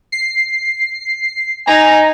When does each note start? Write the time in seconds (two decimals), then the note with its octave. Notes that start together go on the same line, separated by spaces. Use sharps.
0.12 C7
1.67 D#4 G#5 A#5